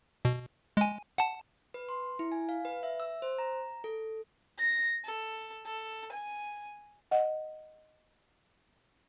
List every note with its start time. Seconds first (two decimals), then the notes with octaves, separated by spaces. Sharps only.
0.25 B2
0.77 G#3 G#5
1.18 F#5 A5
1.74 B4
1.89 C6
2.19 E4
2.32 G#5
2.49 F5
2.65 B4
2.83 E5
3.00 E6
3.22 C5
3.39 A#5
3.84 A4
4.58 A#6
5.05 A4
5.66 A4
6.12 G#5
7.11 D#5 F#5